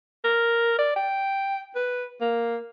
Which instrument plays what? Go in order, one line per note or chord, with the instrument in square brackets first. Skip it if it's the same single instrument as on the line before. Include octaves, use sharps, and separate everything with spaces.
[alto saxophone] A#4
D5
G5
B4
A#3